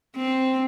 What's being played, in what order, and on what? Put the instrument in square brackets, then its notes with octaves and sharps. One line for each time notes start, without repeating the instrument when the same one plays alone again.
[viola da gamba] C4